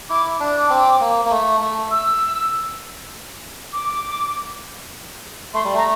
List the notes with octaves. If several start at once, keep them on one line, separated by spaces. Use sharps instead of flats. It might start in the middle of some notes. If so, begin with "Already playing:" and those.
E4 D6
D4
D6
C4
A#3
A#3
A3
A3
E6
D6
A3 C6
G3
A3 A#5